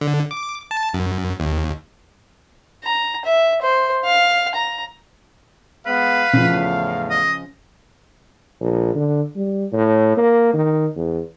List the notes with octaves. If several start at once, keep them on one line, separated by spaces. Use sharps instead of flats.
D3
D6
A5
F#2
D#2
A#5
E5
C5
F5
A#5
G#3 B3 B4 F5
E2 A2 C#3 F3
D#5
A#1
D3
G3
A2
A#3
D#3
E2